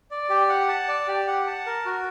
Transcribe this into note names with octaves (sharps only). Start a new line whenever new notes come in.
D5
G4
F#5
A5
D5
G4
F#5
A5
A#4
F#4